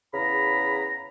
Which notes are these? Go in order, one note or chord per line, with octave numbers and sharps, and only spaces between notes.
E2 C#3 A#5 B5